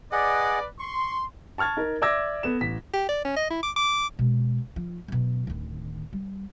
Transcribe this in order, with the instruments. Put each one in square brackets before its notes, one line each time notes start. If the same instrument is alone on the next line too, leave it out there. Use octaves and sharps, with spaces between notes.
[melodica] G#4 D#5 F#5 [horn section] B4 D5
[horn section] C6 [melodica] C#6
[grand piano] A5 C#6 F6 G#6 A6
D#4 A#4
D5 E5 D6 E6 G#6 A#6
B3 A4 E7
A1 B6
[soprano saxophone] G4
D5
C#4
D#5
E4
D6
D6
[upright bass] B2 G#3
F3
F#2 B2
D1 D#3
G3